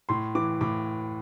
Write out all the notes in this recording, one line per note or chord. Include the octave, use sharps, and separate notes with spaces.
A2 C6
E3 D6
A2 D6